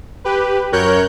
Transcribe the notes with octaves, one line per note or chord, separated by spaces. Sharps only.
G4 B4
F#2 A#4 C#5 F#6 G6